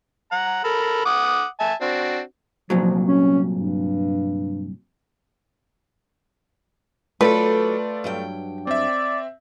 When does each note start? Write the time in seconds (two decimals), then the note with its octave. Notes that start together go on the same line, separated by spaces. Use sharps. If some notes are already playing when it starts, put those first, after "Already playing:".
0.32 F#5 A#5
0.64 A4 A#4 B5
1.05 F#5 D6 D#6
1.60 E5 G#5 A5
1.81 C4 D4 F#4
2.70 C2 A#2 F3 F#3
3.08 C#4
3.57 G2
7.21 F#3 A3 D4 F4 A4 B4 D5
8.04 G2 F#3 G5
8.67 C4 D5 E5